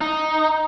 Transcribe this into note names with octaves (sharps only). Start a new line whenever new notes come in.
D#4